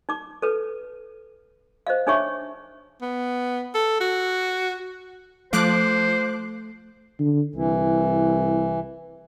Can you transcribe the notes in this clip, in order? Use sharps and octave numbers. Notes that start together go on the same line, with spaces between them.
D#4 D6
A4 B4
C5 D#5 F5
D4 D#4 G#4 C#5 E5 C#6
B3
A4
F#4
F3 A3 C5 D6 F#6
D3
C2 E3